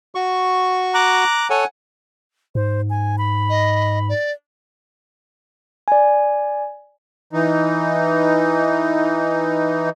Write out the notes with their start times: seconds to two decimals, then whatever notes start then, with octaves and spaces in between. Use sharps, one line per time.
0.15 F#4 C#6
0.94 A#5 D6 F#6
1.50 A4 C#5 F#5 G#5
2.55 G#2 C5
2.90 G#5
3.18 B5
3.49 D#5
4.09 D5
5.88 D5 G#5
7.33 E3 D#4